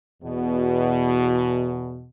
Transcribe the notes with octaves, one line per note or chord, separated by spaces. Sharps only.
E2 B2